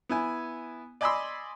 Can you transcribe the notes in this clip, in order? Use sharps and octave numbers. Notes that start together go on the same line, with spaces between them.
B3 E4 G#5
D5 D#5 G#5 B5 C6 E6